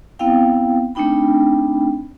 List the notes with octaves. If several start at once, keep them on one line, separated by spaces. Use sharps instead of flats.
B3 C4 E4 F5 G5
A3 C4 D4 D#4 G5 B5